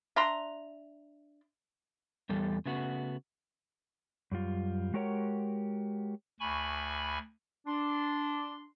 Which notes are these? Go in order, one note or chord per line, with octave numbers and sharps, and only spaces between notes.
D4 E5 A#5 C6
E2 G3 A4
C#3 A3 B3 F#4
F#2 G3 F4
G#3 F#4 G4 A#4 C#5 F#5
D2 G#5 B5 C#6
D4 C6